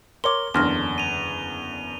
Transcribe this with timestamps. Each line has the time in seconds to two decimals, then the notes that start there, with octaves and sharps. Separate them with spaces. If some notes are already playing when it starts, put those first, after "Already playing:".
0.24 A#4 C#5 C6 D6 G7
0.54 F#1 E2 D3 C6 F6 A#6
0.98 D#7 F7